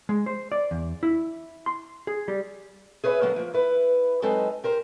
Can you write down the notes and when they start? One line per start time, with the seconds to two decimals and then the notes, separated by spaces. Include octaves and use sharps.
0.09 G#3
0.26 C5
0.52 D5
0.71 E2
1.03 E4
1.66 C6
2.07 G#4
2.28 G3
3.04 G#4 B4 C#5 D#5 E5
3.22 D3 F#3 A#3 B3
3.36 F3 A#3
3.54 E4 B4
4.22 F#3 G#3 C4 D#4 A4 B4
4.64 G4 A#4 C5